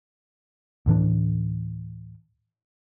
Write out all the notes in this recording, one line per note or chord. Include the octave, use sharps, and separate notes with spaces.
D2 A2 E3 D4